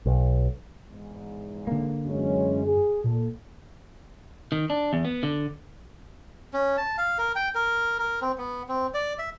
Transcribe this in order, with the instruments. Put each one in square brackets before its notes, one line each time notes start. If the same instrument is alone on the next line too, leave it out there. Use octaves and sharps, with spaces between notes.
[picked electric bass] B1
[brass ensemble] E2 G#2
[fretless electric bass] D3 A#3
[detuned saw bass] F#2 [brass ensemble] E3 G#3 C#4
[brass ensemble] G#4
[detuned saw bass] A#2 [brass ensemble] A4
[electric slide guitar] D#3
D4
E2
B3
D3
[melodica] C#4
A5
F5
A#4
G5
A#4
A#4
C4
B3
C4
D5
E5